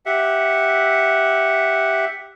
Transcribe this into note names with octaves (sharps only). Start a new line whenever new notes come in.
G4 E5 F#5